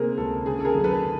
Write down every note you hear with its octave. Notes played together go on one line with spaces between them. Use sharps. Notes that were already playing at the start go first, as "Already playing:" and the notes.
Already playing: C3 A#3 G#4 A#4 C5
C#2 A4
C#3 G#4
A4
G#4 A#4
F#2
A4 B4